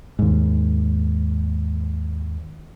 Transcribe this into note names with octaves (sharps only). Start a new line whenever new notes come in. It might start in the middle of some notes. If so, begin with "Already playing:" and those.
D#2 G#2